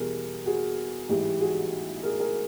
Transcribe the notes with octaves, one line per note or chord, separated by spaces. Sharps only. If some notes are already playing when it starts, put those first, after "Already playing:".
Already playing: E2 B2 G3 G#4 A#4
F#4 G#4
A1 G#2 E3 G3 G4
F#4 G#4
G#4 A#4
G#4 A#4